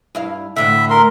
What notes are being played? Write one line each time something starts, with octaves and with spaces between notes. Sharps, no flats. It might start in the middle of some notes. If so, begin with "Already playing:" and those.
G2 E4 F5
D2 A2 D3 E5
A#4 C6